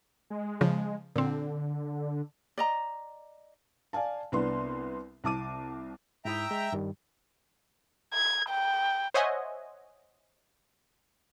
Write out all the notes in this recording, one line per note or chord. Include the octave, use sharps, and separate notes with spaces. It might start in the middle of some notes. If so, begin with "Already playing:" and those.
G#3
C#3 F3 G#3
A#2 D3 C4
D5 D#5 A#5
D5 F5 G#5 A5
C2 B3 D4 C6
C2 A5 D6 D#7
G#2 E4 E5 G5 A#5 D#6
G#3
G2 D#3 G3
G#6
G5
C5 C#5 D#5 E5 F#5 G#5